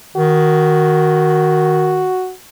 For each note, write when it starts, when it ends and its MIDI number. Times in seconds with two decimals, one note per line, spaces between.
0.16 2.11 51
0.16 2.32 66